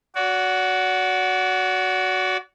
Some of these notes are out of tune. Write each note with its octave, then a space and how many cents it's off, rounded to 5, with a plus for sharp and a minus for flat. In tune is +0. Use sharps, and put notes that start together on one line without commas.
F#4 +0 D5 -40